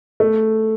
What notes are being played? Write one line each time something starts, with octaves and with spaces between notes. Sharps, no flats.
A3